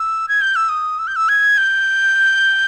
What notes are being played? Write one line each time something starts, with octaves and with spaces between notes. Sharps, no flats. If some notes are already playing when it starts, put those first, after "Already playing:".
Already playing: E6
G#6
G6
E6
D#6
E6
G6
E6
G#6
G6